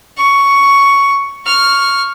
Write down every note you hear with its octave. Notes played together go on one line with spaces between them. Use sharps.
C#6
C#6 F6